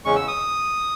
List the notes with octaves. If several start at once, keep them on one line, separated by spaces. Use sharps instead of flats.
E2 C#3 G#3 C#4 C#6
E6
D#6